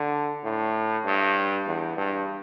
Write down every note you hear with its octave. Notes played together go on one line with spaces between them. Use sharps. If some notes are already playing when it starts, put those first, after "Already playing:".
Already playing: D3
A2
G2
E2
G2